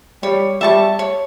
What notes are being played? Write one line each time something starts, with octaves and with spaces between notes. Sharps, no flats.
G3 C#5
G3 E5 A5 C#6
C#5